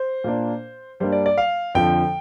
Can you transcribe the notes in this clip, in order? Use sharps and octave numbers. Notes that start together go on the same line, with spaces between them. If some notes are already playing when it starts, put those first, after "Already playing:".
Already playing: C5
A#2 A#3 D4
G2 G3 A#3 D4 C5
D5
D5
F5
F2 D3 F3 G5